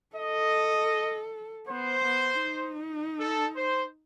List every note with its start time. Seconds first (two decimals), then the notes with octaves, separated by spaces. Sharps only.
0.16 A4 D#5
1.67 B3 C5
2.05 B3
2.43 D#4
3.18 A4
3.56 C5